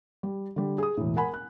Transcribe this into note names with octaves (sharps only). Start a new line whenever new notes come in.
G3
D3 G3
G#4 D#6
E1 A2
A#4 F#5 G#5 B5
F#6